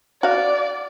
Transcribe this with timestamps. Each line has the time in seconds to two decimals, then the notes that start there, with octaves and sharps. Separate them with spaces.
0.23 F#4 D5 F5